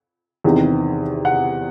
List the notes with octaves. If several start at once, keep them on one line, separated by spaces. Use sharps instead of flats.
E2 C3 D#3
F#5